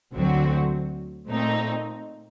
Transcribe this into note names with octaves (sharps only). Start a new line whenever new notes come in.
D2 D3 F#3 C4 F#4
A#2 A3 C4 D#4